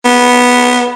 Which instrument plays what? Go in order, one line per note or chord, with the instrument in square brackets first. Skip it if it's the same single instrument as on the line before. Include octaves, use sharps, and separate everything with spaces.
[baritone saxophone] B3